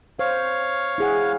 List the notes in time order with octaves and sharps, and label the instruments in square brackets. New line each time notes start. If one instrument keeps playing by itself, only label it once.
[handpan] C5 [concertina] C#5 F5
[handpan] E4 G#4 F#5